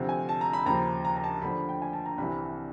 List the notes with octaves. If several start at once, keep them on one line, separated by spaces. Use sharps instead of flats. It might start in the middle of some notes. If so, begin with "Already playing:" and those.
Already playing: D2 C3 F3
G#5
A5
A#5
B5
D#2 C#3 F3 A#5
A#5
A#5
A5
D2 D3 F3 B5
G5
G#5
A5
A#5
C2 C3 E3 B5